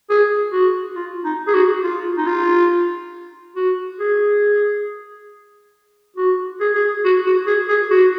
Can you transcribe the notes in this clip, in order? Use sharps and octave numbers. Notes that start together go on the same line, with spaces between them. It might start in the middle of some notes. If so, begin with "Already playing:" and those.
G#4
F#4
F4
D#4
G#4
F#4
F4
D#4
F4
F#4
G#4
F#4
G#4
G#4
F#4
F#4
G#4
G#4
F#4